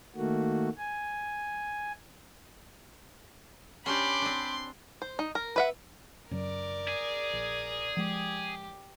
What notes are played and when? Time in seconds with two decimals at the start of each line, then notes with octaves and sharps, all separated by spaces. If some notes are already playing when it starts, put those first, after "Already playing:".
0.16 D#3 A3 A#3 F#4
0.78 G#5
3.86 C#4 D4 G4 B5 C6 D6
4.22 C4 D4
5.02 C5
5.19 D#4
5.35 A#4
5.56 B4 E5 F#5
6.31 F#2 C#3 F#3 A#4 D5
6.88 G#4
7.33 A#1
7.97 F3 G#3 G4